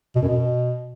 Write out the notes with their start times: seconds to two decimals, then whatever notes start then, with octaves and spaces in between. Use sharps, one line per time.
0.15 B2
0.22 F#2
0.29 B2